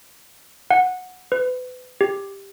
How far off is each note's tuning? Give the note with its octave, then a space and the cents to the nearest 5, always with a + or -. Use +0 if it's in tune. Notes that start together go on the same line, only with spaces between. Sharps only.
F#5 -15
B4 +35
G4 +10